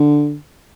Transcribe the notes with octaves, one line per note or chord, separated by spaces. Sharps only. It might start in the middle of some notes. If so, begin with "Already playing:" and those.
Already playing: D3